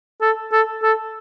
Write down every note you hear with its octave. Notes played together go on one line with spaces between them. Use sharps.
A4
A4
A4